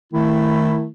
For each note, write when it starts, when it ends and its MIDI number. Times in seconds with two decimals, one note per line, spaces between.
0.13 0.87 51
0.13 0.87 57
0.13 0.87 64